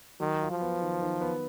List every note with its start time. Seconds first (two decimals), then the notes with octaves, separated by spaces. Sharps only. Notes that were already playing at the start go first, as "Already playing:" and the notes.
0.20 D#3 F#3
0.41 F4
0.51 F3
0.61 B3
0.82 D#3
1.02 D#3
1.21 B3